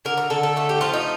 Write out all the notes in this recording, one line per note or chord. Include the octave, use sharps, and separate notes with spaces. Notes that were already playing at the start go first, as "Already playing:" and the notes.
D3 A#4
A#4
D3 A4
A4
A3 A4
G4
F3 F4
D#4